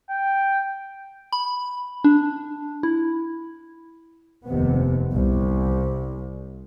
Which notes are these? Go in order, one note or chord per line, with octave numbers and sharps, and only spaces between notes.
G5
B5
D4
E4
F1 D#2 C3 B3
C2